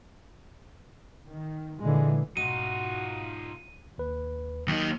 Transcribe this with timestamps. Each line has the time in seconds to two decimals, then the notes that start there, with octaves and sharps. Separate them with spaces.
1.29 D#3
1.80 A#2 D3 E3 G#3
2.37 G#2 B2 D#4 F4 F#4 D#7
3.98 D#2 B4
4.68 D#2 F#3 D#4